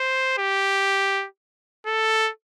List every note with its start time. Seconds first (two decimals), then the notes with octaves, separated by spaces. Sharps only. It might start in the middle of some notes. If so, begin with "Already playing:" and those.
Already playing: C5
0.38 G4
1.86 A4